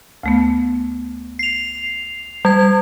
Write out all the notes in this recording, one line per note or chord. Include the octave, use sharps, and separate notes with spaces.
D2 A3 B3
C7 F7
G3 G#6